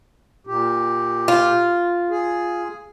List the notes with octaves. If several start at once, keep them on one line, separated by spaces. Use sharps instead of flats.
A#2 G4
F4
G#4